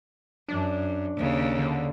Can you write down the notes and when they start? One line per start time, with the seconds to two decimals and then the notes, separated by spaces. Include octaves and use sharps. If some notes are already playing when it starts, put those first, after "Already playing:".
0.48 F#2 D4
1.17 D#2 C#3
1.59 D3